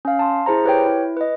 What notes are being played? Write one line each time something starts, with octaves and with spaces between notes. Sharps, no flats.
C#4 F5
A5 C6
E4 G#4 C5 A#5
G4 B4 C#5 G5
E4
B4 D#5